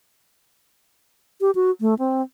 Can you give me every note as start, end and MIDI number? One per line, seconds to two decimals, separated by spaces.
1.41 1.51 67
1.55 1.71 66
1.81 1.95 57
1.99 2.22 60